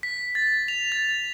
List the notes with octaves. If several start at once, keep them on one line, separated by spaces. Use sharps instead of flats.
B6
A6
F7
A6